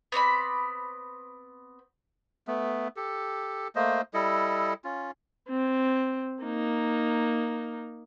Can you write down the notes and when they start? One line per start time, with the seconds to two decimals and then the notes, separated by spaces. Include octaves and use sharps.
0.12 B3 C4 D5 B5
2.48 A3 B3
2.96 G4 A4
3.75 A3 A#3 C5 D#5
4.14 G3 E4 A4 D#5
4.84 C#4 F4
5.49 C4
6.43 A#3 D#4